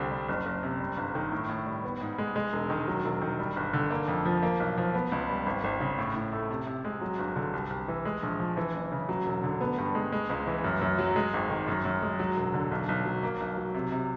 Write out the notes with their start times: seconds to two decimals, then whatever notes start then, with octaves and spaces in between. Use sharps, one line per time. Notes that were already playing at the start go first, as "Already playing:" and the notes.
Already playing: C2 D3 C4
0.11 G3
0.29 F#1
0.46 F#1
0.63 C3
0.80 G3
0.97 G1
1.15 D#3
1.32 A2
1.49 A2
1.66 G3
1.84 B3
2.01 G#2
2.18 G#3
2.36 G#3
2.53 E1
2.70 D#3
2.87 F#3
3.05 E1
3.22 D#3
3.39 G3
3.56 G1
3.73 D3
3.91 A#3
4.08 F2
4.25 F3
4.43 A#3
4.60 B1
4.77 F3
4.94 B3
5.12 C#2
5.29 G3
5.46 G#1
5.64 G#1
5.80 C#3
5.98 A2
6.15 A2
6.33 A3
6.50 C3
6.67 C3
6.85 G#3
7.01 F#3
7.19 G1
7.36 D3
7.53 C2
7.70 C2
7.88 E3
8.05 G#3
8.23 A#1
8.40 F3
8.57 E3
8.74 F#1
8.92 C#3
9.09 F#3
9.26 E1
9.43 D3
9.61 B3
9.78 G2
9.95 G#3
10.12 G#3
10.30 C#2
10.47 E3
10.64 F#2
10.81 F#2
10.99 F#3
11.16 G#3
11.34 G#1
11.50 D#3
11.68 F#2
11.85 F#2
12.02 G#3
12.19 F#3
12.37 E1
12.54 D3
12.71 B1
12.89 B1
13.06 F#3
13.23 A#3
13.40 B1
13.57 F#3
13.74 C3
13.92 C3